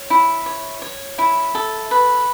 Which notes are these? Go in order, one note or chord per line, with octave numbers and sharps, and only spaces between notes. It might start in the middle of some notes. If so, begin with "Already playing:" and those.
Already playing: C#5
E4
C#5
C#5
E4
A4
B4